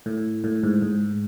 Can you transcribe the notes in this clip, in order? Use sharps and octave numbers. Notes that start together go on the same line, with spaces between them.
A2
A2
G#2
G#2